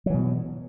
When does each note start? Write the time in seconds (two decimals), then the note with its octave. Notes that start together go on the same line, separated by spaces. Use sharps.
0.06 F#3
0.10 E3
0.14 B2